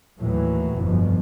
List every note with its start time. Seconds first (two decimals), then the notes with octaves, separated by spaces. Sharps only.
0.20 D#2 A2 E3 F#3
0.80 G1 F2 B2 F3